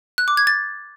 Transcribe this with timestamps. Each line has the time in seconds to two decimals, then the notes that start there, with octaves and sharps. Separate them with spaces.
0.18 F#6
0.28 D6
0.37 G#6
0.47 A6